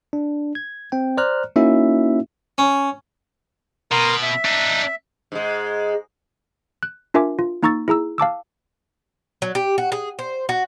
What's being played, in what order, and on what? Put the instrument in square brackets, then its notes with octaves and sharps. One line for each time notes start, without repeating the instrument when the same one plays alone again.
[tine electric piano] D4
G#6
C4 G5
C5 D5 A#5 F6 F#6
A#3 C#4 D#4 E4 F#4 E5
[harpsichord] C#4
[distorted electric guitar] B2 [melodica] A#4 A#5 C6
[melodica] E5
[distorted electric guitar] D4 D#4
[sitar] G#2 G#3
[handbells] F#6
D4 F4 A#4 E5 G#5 D6
F4
A#3 D#4 A#5 C#6 E6 A6
E4 G#4 A#5 E6
F5 A5 D6 E6
[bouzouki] F#3
G4
F#4
G#4
C5
F#4